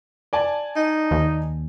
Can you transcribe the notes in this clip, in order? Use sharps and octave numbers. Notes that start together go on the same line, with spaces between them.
D5 G#5 A5
D#4
D#2